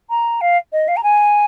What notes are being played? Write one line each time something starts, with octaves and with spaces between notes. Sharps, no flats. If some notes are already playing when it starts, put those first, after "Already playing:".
A#5
F5
D#5
F5
A#5
G#5